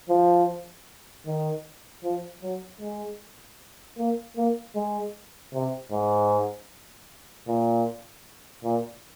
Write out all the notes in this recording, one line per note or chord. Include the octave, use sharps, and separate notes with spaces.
F3
D#3
F3
F#3
G#3
A#3
A#3
G#3
C3
G#2
A#2
A#2